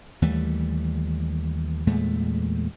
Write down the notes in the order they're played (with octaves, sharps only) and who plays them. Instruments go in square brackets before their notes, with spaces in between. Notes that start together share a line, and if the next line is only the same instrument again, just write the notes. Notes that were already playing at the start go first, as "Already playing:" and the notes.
[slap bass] D#2 E3 G3 A3
E2 A#2 G#3 A3